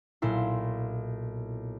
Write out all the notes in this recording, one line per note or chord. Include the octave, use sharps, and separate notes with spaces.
B1 A#2 E4 C6